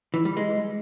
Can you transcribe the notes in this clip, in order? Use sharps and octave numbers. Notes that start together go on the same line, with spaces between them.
E3
G3
G#3